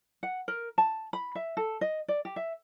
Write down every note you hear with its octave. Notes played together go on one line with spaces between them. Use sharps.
F#5
A#4
A5
B5
E5
A4
D#5
D5
G4
E5